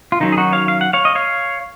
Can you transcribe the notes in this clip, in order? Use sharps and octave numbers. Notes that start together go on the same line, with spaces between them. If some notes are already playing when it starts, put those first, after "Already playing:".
F4
D#3 F#3 C#4 D#4
G#4
D#4 F#4
C#5 F5
F5
F#5
C#5 F5
D#5
C#5 F5